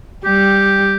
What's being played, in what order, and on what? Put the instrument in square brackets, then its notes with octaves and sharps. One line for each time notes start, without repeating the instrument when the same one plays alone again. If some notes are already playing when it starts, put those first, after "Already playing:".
[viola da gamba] G3 [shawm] G4